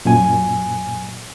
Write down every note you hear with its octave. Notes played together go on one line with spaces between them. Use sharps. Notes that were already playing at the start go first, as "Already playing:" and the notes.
F#2 A#2 G#5